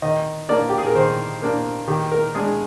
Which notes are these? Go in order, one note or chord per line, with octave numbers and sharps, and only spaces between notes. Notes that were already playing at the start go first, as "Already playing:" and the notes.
D#3 D#5
A#3 D4 D5
G4
G#4
A#4
D#3 C5
A#3 D4
D#3 G4
A#4
G#3 D4 G#4